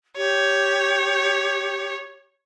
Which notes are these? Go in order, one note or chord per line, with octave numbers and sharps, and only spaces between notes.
G4 C#5